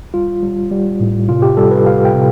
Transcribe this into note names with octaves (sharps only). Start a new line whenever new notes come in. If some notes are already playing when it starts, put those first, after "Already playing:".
G3 F4
G3
G3
A2
C3 F4
G4
G3 A4
B4
G3 F5
G5
C3